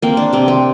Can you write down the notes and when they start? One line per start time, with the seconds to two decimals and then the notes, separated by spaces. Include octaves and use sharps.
0.02 A#3 C4
0.17 D4
0.33 C3 C4
0.48 C4